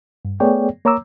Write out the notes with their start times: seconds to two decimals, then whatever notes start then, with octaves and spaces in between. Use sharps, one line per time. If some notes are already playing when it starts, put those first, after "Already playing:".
0.25 G2
0.40 A3 B3 G#4 C#5 D5 G5
0.85 A#3 C#5 A#5 D6 E6